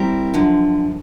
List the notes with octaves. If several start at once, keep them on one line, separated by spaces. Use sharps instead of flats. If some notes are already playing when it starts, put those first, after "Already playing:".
Already playing: G3 C4 E4 G4 A#4
F#2 D3 F3